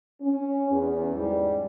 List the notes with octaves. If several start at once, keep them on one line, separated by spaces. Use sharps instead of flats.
C#4
E2
G#2 G3